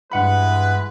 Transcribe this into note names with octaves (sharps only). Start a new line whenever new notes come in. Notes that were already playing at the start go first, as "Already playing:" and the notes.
G2 E3 G#3 B4 F#5 B5